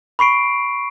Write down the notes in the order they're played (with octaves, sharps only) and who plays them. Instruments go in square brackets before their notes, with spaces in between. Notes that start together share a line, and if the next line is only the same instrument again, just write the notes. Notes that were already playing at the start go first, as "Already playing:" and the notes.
[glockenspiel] B5 C#6 C7 D7